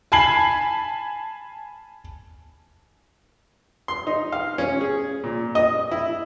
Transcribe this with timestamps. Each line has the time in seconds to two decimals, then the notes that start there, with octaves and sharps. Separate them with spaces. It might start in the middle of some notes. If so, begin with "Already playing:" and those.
0.12 G#5 A5 B5 G#6 C7 F#7
3.88 C6
4.07 D#4
4.32 F5
4.58 C#4
4.81 G#4
5.24 A#2
5.55 D#5
5.91 E4